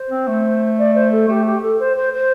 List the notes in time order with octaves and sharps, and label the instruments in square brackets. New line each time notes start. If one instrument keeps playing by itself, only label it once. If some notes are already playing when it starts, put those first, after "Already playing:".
Already playing: [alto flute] C5
[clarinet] C4
A3
[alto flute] D5
C5
A4
[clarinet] A3 [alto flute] G4
[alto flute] G4
A4
C5
C5
C5